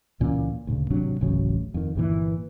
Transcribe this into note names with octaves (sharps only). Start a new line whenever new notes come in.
C#2 A#2 E3 C#4
D2 A#2 C#3
G#1 C3 F#3 D4
D1 A1 C#3 F#3
F2 D#3
G1 G2 A#2 E3